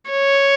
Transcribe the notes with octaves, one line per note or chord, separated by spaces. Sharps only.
C#5